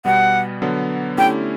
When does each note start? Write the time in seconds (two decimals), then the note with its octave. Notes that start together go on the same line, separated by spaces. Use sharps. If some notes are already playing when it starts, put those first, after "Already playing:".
0.05 B2 G3 B3 F#5
0.62 D3 F#3 B3
1.18 D3 A3 C#4 E4 G4 G5